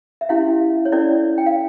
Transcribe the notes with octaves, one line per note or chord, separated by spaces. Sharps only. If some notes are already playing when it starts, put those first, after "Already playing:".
E5
C#4 E4 G4 F5
C#5
C#4 E4 A4 D5
G5
F5